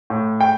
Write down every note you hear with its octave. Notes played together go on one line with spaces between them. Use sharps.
A2
G5